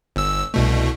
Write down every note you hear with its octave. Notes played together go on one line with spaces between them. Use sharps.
G1 E6
C2 B2 A3